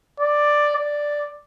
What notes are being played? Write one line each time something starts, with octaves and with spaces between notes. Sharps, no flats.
D5
D5